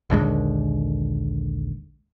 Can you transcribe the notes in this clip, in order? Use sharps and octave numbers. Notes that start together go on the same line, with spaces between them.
A#1 D#2 D3 G#3